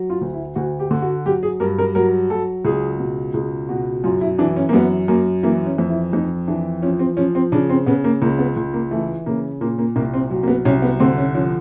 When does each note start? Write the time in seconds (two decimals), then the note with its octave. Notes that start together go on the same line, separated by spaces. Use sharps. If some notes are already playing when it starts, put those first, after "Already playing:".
Already playing: F#3
0.10 F4
0.21 D2
0.33 E4
0.55 D2 F#4
0.79 G4
0.91 D3
1.02 F#4
1.25 F#3 G4
1.43 G#4
1.60 G2 A#4
1.78 A#4
1.95 F#3 A#4
2.30 F#3 A4
2.65 C#2 G#4
2.99 B2
3.34 C#2 G#4
3.69 B2 F#4
4.04 F#2 F4
4.21 E4
4.38 E3 D4
4.57 C#4
4.69 A#3
4.73 F#2 B3
5.08 F#2 A#3
5.43 E3 A#3
5.66 C#4
5.78 F2
5.90 E4
6.12 F2 D#4
6.47 E3 D4
6.83 F3 C#4
6.99 C4
7.17 F3 C#4
7.35 C4
7.52 C#3 D4
7.69 C4
7.86 C#3 B3
8.04 A#3
8.22 C#2 A#3
8.39 B3
8.57 C#2
8.73 A#3
8.91 E3 A3
9.26 C#3 A#3
9.61 A#2 A#3
9.79 A#3
9.96 C2 A#3
10.14 C4
10.31 F#3
10.43 A#3
10.47 B3
10.65 C2 C#4
10.82 B3
11.00 D3 C4
11.18 C#4
11.34 F3 C#4